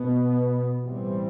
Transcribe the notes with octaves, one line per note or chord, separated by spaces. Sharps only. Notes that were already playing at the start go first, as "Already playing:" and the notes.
Already playing: B2 B3
A2 E3 G3 C4